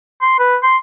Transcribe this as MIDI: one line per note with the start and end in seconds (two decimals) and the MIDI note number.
0.22 0.36 84
0.39 0.56 71
0.63 0.77 84